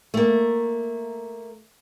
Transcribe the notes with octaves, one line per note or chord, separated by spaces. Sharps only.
A3 A#3